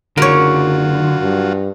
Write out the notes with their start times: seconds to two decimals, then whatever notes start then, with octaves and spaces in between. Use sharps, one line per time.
0.17 F#1 D3 F#3 F4 F#4 A#4 C#5
1.22 G2